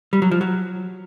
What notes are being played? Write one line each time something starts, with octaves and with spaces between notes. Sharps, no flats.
G3
F#3
F3
F#3